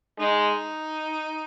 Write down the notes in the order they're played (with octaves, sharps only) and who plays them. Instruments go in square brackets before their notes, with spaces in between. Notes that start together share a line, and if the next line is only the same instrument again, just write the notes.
[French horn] G#3 [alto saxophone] D#4